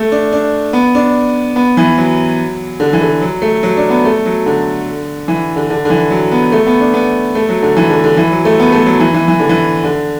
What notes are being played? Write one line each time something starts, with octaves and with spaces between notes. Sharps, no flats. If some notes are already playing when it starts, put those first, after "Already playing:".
Already playing: A3
D4
D4
B3
D4
B3
E3
F#3
D3
E3
D3
F#3
A3
F#3
D4
B3
A3
F#3
D3
E3
D3
D3
D3
E3
F#3
B3
A3
B3
D4
B3
A3
F#3
D3
E3
D3
D3
E3
F#3
A3
B3
A3
F#3
E3
E3
E3
D3
E3
D3